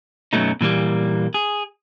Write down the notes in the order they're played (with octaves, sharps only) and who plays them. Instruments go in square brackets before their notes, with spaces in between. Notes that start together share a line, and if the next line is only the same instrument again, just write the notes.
[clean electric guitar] F#2 B2 F#3 A3 D#4
A#2 E3 G3 A#3
G#4